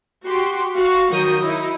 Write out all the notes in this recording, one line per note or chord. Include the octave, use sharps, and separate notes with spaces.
F#4 G4 C6
F#4 F5
D#3 F#3 F#4 A#4 D#6 G6
D#4 E4